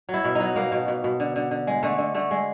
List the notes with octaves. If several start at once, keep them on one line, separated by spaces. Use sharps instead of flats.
F#3
E4
B2
D#4
F#3
B2 A#3
B2
B2
B2
D3
D3
D3
G#3
D3 A3
D3
D3 A3
G#3